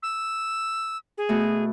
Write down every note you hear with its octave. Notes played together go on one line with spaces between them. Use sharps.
E6
G#4
B2 A3